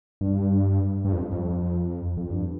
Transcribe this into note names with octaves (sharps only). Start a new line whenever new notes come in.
G2
G2
F2
F2
F2
G2